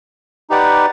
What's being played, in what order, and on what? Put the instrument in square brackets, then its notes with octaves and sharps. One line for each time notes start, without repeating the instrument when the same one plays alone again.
[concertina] D#4 G4 B4 D5 F#5